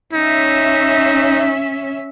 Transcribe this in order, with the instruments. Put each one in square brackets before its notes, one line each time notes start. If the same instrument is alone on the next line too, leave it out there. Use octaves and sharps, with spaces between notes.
[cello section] C#4 E5 [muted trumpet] D#4